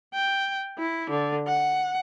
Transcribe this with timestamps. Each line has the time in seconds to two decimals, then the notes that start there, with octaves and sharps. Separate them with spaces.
0.14 G5
0.79 E4
1.10 D3
1.47 F#5